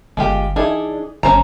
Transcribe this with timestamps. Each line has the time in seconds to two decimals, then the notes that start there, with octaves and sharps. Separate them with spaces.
0.17 G1 G#3 F4 G4
0.56 E3 D4 D#4 G#4
1.23 G1 C#4 C5 A#5